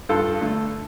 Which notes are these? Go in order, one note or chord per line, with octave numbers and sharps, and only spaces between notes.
G2 F4 A4
D3 A3